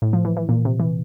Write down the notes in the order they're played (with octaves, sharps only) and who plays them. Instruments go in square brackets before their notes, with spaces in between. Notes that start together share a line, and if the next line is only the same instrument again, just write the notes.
[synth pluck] A2
F3
E3
E3
A#2
C3
E3